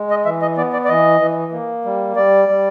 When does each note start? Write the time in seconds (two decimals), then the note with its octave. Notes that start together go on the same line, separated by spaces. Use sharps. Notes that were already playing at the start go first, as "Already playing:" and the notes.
Already playing: G#3
0.10 D#5
0.25 E3 E5
0.42 D#5
0.57 B3 D5
0.73 D5
0.85 D5
0.89 E3 D#5
1.21 E3
1.52 A#3
1.85 G3
2.16 G3 D5
2.49 G3